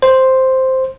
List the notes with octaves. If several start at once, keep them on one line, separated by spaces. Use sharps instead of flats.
C5